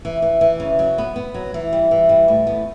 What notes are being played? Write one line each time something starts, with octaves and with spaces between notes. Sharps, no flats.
E3
E3
E3
C#3
F#3
B3
B3
F#3
E3
G3
E3
G3
A2
B3